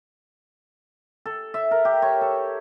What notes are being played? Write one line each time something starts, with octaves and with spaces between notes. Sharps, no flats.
A4
E5
A#4
G4
C#5
A4